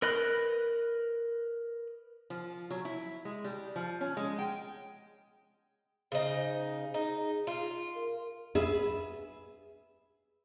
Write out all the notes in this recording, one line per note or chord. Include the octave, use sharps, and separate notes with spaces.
A#4 B4 D#5 B5 F#6
F3
F#3
E4
G#3
G3
F3
C#4
G#3
G5
C#3 D#4 C5
D#4 G#4
F4
A#4
G#4 B4 E5